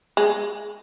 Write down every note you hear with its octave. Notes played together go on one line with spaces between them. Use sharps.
G#3